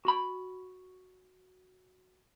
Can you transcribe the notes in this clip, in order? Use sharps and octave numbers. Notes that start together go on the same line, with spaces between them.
F#4 B5